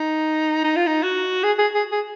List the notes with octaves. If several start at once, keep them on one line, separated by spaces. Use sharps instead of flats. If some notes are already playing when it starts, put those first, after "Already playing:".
Already playing: D#4
D#4
F4
D#4
F#4
G#4
G#4
G#4
G#4